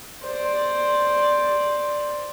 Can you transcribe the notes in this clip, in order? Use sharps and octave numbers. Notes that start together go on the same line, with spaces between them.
C5 D5